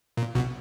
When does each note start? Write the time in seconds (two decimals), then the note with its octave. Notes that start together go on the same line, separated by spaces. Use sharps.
0.17 A#2
0.35 B1 B2